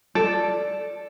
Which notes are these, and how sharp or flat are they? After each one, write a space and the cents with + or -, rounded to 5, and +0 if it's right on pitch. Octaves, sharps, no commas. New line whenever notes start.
A4 +0 D5 +0